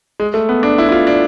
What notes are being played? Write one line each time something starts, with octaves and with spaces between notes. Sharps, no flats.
G#3
A3
B3
D4
E4
E4
F4
D4